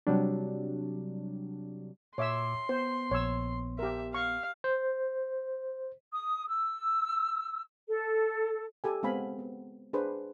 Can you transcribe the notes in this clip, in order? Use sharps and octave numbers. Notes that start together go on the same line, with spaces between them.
C3 F#3 G3 D4
A#2 C#5 E5 C6 D6 E6
B3 C5
A#1 C#5 E6
G4 A#4 E5
F5 C#6
C5
D#6
E6
A4
G4 A4 G#5
G#3 B3 C4 F5 G#5 B5
B3
D4 G#4 B4 C5